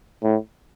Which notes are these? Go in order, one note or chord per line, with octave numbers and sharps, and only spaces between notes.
A2